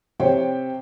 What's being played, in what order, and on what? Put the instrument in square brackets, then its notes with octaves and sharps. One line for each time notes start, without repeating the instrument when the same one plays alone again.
[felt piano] C3 G4 C5 C#5 G5